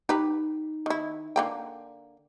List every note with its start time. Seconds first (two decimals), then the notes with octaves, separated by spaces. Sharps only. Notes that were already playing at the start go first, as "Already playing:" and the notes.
0.09 D#4 G4 B4
0.86 D#3 E4
1.36 D3 A#3 G5